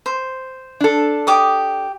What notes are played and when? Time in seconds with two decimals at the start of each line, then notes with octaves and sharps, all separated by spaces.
0.06 C5
0.80 D4 A4
1.27 G4 D6 D#6